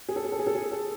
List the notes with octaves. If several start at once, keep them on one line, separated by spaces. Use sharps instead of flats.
G#4
A4
G#4
A4
G#4
A4
G#4
A4